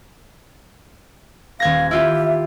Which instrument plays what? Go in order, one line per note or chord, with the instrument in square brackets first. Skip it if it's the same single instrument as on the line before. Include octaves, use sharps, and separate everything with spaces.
[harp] D#1 G#6 A#6 [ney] F5
[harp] E4 F4 G4 [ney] E5